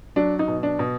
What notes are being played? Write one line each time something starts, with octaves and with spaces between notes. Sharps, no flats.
F#3 D4
D#4
B2
D4
B2